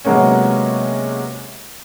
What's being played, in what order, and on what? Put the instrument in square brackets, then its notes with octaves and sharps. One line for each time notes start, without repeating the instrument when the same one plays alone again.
[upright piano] C3 F#3 G#3 A#3 B3 C#4